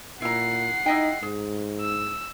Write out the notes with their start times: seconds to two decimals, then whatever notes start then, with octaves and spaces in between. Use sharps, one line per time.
0.22 A#2 E4 F#5 A#5 C7
0.86 D#4 E4 D#5 G5
1.23 G#2 G#4
1.81 E6